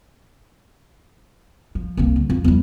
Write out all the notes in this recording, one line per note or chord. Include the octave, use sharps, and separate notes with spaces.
F3
C2 A#3
D2
F2
E2 G3